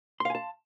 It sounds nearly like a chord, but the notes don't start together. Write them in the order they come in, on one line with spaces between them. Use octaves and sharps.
C6 F5 G#5 A5